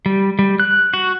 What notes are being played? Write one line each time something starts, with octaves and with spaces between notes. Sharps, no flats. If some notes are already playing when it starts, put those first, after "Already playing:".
G3
G3
F#6
F#4